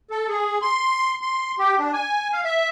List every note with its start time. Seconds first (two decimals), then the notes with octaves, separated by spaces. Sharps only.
0.11 A4
0.29 G#4
0.62 C6
1.21 C6
1.58 G4
1.79 D4
1.93 G#5
2.33 F5
2.45 E5